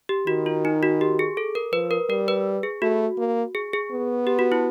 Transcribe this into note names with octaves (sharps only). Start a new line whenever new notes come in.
G4
D#3 F#4
F4
D#4
F#4
G4
G#4
A4
A#4
F3 B4
A#4
G3 A#4
B4
G#4
A3 F#4
A#3
G#4
G#4
B3
G4
F#4
E4